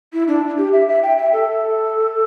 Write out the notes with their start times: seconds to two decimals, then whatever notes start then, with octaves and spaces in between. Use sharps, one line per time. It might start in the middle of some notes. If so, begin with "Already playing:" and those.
0.13 E4
0.28 D4
0.58 G4
0.73 E5
0.89 E5
1.03 G5
1.18 E5
1.33 A4